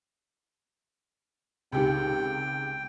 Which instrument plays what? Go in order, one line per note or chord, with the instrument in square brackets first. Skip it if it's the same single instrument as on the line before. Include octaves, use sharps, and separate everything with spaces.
[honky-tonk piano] C#2 C3 D#3 [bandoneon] G5